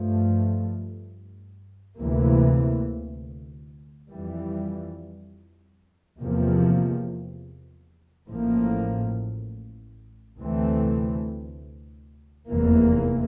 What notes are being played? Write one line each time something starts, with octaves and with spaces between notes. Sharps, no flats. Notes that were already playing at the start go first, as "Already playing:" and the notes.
Already playing: G2 F3 A3
D2 C3 E3 A#3
F2 E3 G3
E2 C3 F3 A#3
A1 A2 F3 A#3
D2 C3 E3 A3 C4
F1 E2 C3 E3 A#3